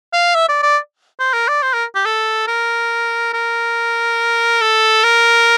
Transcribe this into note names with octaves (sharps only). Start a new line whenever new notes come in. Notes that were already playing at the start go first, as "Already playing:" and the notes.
F5
E5
D5
D5
C5
A#4
D5
C5
A#4
G4
A4
A#4
A#4
A4
A#4